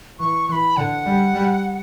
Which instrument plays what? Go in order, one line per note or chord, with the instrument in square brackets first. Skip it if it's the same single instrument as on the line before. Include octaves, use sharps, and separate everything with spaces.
[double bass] E3 [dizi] C#6
[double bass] E3 [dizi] C#6
[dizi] B5
[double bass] D3 [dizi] F#5
[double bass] G3
G3